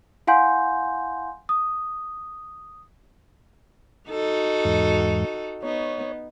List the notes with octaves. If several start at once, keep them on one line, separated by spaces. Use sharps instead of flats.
E4 F5 F#5 G#5 C6 G6
D#6
D#4 F#4 A4
E2 G#2
B3 D#4 C#5